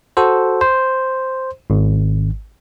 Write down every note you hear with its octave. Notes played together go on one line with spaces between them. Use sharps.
F#4 A4 C5
C5
G#1